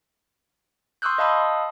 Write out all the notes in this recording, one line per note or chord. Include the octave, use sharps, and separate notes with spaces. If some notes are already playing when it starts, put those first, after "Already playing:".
C6 C#6 D#6 E6 F#6 G6
D#5 F5 A5 B5 D#6 E6